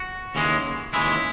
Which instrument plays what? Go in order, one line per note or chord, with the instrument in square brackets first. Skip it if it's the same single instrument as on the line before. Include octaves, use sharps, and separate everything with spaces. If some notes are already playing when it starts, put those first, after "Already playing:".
Already playing: [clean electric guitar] F#4
D#2 C#3 E3 G#3
D#2 C#3 E3 G#3 E4